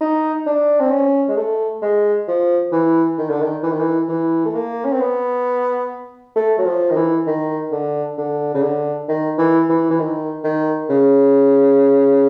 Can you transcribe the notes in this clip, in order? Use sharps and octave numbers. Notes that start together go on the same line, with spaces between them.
D#4
D4
C4
C#4
G#3
A3
G#3
F3
E3
D#3
D3
D#3
E3
D#3
E3
E3
A3
A#3
C#4
C4
B3
A3
F#3
F3
D#3
E3
D#3
D3
D3
C#3
D3
D#3
E3
E3
E3
D#3
D#3
C#3